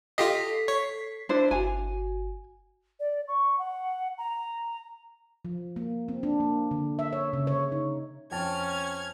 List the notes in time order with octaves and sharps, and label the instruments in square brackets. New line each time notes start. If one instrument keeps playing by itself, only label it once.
[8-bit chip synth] F4 G4 D#5 [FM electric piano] A4 B6 C7
[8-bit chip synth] C#5
[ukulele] D4 E4 C5
[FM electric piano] G1 F#4 [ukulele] G#5
[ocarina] D5
C#6
F#5
A#5
[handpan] F3
A#3
C4
D4
A#3
D3
E5
C#5
C#3
C#5
D#4
[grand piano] F2 G5 A5 [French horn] C#4 [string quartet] F6 G#6